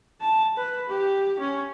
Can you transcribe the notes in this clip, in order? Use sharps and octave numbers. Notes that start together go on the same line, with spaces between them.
A5
B4
G4
C#4